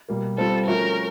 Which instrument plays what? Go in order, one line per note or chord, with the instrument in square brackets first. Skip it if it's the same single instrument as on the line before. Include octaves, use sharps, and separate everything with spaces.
[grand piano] B2 G3 A#3
[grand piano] G3 C4 F4 [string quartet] A4
[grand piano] F3 A3 C#4 F#4 [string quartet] A#4